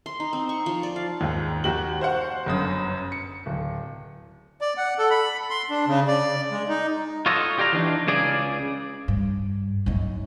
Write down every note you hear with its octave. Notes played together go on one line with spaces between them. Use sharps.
C6
D#4
C4
C#6
F3
D5
F5
D#2 G#2
D#2 F#4 G4 F#7
C5 F5 F#5 C#6
G1 F#2 D#6
C#7
D1
D5
F#5
A4
B5
C6
D4
C#3
D5
G#3
D#4
F4 F#4 A4 C#5 D#5
G4 D5 F5 A#5
E3 D4 D#4
C#2 C#3 G#4 D5
G2
F#2 D#4